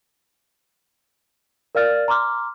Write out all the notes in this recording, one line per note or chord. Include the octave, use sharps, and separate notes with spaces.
A#4 D5 F5 F6 A6
A#5 C6 D6 F6